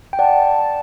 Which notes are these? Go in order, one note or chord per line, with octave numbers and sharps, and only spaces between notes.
G5
D5 F#5 A5